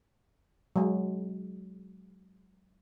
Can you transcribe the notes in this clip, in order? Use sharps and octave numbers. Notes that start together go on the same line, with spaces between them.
F#3 G#3